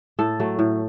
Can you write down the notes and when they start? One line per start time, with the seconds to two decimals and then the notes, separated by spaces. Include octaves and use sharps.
0.19 A2 A4
0.40 F#3 A3
0.59 A2